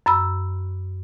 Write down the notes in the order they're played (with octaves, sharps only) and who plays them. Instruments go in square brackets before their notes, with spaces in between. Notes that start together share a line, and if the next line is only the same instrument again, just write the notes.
[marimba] F#2 B5 E6